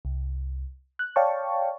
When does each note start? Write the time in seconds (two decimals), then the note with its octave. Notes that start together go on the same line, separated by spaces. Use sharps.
0.05 C2
0.99 F#6
1.16 C#5 D5 F5 G5 A5 C#6